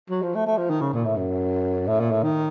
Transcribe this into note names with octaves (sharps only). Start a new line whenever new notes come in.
F#3
F3
A3
A3
F3
D#3
C#3
A#2
A2
F#2
A2
A#2
A2
D#3